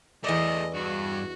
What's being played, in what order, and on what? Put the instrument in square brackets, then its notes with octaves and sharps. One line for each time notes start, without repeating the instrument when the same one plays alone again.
[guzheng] E2 D5 [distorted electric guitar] A3 G#4 [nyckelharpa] D#5
[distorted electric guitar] G2 [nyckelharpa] F#4